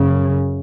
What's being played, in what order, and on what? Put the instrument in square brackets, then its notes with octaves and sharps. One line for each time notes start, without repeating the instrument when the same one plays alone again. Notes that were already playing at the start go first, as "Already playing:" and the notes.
Already playing: [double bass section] F#2 C#3